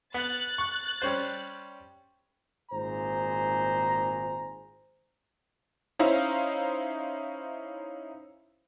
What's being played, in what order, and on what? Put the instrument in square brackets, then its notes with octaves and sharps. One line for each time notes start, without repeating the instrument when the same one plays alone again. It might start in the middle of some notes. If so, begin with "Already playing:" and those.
[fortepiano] B3 [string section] F#6 A6
[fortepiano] C#6
G3 C#4 C5
[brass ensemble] G#1 A#2 G#4 C5 A#5
[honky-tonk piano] C#4 D#4 E4 C5 E5 F5